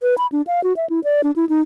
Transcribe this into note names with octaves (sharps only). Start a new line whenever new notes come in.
B4
B5
D4
F5
F#4
E5
E4
D5
D4
E4
D#4